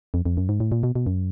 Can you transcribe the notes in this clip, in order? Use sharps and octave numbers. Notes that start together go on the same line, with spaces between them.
F2
F2
F#2
G#2
A2
A#2
B2
B2
F#2